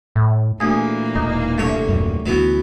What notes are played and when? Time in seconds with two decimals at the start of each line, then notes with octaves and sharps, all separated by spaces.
0.15 A2
0.60 D2 A#2 E3 A#3 G#4
1.15 E1 D#4
1.58 C2 G2 A3 C#5
1.89 D#1 F#2
2.26 D2 E3 F#3 B3